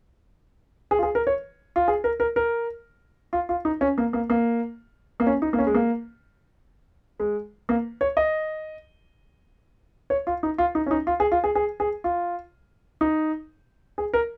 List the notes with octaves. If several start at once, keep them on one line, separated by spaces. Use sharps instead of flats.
G#4
F4
G#4
A#4
C#5
F4
G#4
A#4
A#4
A#4
F4
F4
D#4
C#4
A#3
A#3
A#3
A#3
C#4
D#4
A#3
C#4
G#3
A#3
G#3
A#3
C#5
D#5
C#5
F4
D#4
F4
D#4
C#4
D#4
F4
G#4
F4
G#4
G#4
G#4
F4
D#4
G#4
A#4